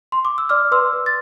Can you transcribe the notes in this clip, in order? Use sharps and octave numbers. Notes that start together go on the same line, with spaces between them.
C6
D6
E6
D5 D6 F6
B4 C6 E6
B4
A6